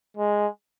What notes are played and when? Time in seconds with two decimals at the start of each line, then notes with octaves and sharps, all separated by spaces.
0.17 G#3